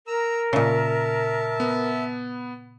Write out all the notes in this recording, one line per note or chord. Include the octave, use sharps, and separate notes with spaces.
A#4 A#5 E6
A#2 C#3 E5 A5
B3